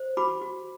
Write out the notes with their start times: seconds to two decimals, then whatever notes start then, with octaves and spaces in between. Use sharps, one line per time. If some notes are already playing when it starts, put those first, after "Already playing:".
Already playing: C5
0.17 F#4 B5 D6
0.41 F#4